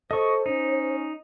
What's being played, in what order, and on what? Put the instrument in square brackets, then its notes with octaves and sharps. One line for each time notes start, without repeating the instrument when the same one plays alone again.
[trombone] A4 [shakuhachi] C5 [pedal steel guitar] D#5 C#6
[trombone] C#4 [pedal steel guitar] D#4